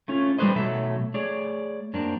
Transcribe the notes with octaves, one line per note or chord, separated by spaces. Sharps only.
A3 C#4 F4
G3 A3 F#4 B4 C5 D#5
B2 F#3 A3 A4 E5
A3 G#4 C#5 D5
F#2 A#3 C4 D4